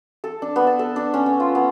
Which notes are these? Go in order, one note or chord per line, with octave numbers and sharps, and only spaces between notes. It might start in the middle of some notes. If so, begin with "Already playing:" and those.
A4
D4
B3
A5
A4
D4
C#4
C#4
F4
B3